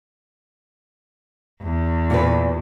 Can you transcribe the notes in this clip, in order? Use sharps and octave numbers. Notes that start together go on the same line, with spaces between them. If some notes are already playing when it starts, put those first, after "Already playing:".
E2
A#2 B4